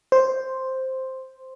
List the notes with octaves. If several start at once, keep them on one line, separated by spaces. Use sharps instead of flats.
C5